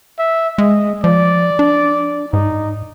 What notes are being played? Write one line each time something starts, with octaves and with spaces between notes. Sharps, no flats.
E5
G#3 D#5
F3 D5
D4
G#2 D#4